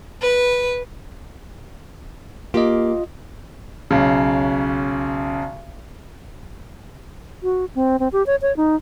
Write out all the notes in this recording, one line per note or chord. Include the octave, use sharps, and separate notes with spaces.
B4
A#3 F4 G4 D#5
B1 C#3
F#4
C4
C4
G4
C#5
C#5
D#4